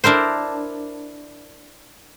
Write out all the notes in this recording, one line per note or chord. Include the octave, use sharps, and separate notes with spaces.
D4 E4 A#4 C5